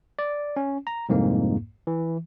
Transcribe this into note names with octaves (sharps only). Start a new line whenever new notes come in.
D5
C#4
A#5
C2 F2 G#2 A#3
E3